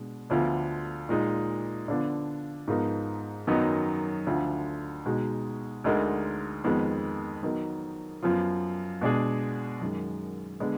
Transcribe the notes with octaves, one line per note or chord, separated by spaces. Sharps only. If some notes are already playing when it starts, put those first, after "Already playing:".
Already playing: B2 G#3 D4
D2 D3 F3 B3 F4
A#2 G#3 D#4
D3 F3 B3 D4 F4
G#2 F3 B3 D#4 A#4
F#2 D#3 F#3 B3 D#4
D2 D3 F3
B2 G#3 D#4 F#4
D2 D3 G#3 D#4 A#4
F2 D#3 G#3 B3
D#3 F#3 B3 D#4 A#4
F#2 F3 B3 F4
B2 G#3 D4 G#4
F#2 D#3 G#3
D3 G#3 B3